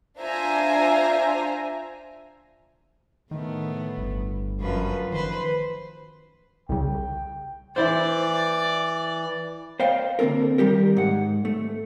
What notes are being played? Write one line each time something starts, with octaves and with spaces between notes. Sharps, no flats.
D4 F4 C5 E5 G#5 A#5
A2 D#3 A3 B3
G1
F#2 F3 B4
D#3 B4 C5
C2 C#3 G5
E3 E4 C5 D5
C5 D#5 F5 G5
D3 A#3 C4 A4 A#4
D#3 G3 G4 A#4
G#2 F#5
A3